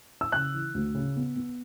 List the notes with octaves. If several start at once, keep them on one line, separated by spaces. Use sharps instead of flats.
E6
C#3 F#6
E3
D2
C#3
B3
B3